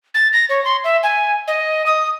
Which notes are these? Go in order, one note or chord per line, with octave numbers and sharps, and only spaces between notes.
A6
A#6
C#5
C6
E5
G#5
D#5
D#6